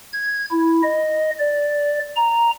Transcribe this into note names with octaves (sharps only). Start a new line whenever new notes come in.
G#6
E4
D#5
D5
A#5